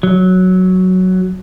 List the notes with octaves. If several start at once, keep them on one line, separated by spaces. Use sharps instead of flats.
F#3